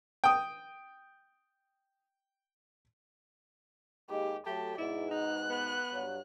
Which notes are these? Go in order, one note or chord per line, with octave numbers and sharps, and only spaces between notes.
G5 D#6
D#2 G#3 G4
F#3 A3 G4 A5
G#2 B2 E4 D5
D#4 F#6
B3
G2 F#3